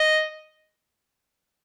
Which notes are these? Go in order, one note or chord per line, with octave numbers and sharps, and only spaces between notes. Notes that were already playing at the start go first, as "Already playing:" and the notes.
Already playing: D#5